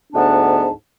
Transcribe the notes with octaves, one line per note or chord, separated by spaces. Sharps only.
D2 G#2 B3 D4 A5